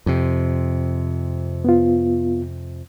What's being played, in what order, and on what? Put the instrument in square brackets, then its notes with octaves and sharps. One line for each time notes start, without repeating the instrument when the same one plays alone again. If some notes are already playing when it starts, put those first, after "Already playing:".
[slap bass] F2 C3
[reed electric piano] B3 F4